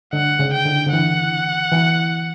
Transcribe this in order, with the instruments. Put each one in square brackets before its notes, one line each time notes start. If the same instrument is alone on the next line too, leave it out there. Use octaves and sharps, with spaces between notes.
[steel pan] D3 [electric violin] F#5
[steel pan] C#3
[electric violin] G5
[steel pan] D3
D3
[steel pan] E3 [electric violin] F#5
[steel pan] E3